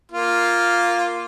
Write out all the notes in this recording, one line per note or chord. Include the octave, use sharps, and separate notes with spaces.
A#3 F4